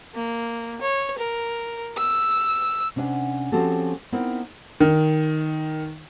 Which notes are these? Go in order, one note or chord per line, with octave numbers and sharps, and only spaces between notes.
A#3
C#5
A#4
E6
C3 C#4 D4 C5 F#5
F3 C4 C#4 F#4 G4 A4
B3 C4 D#4 E4 A#4 C5
D#3